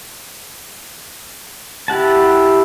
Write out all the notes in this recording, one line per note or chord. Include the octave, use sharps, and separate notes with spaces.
E4 G4 F#5 A5